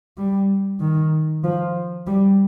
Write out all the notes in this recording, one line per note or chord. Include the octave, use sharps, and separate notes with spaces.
G3
D#3
F3
G3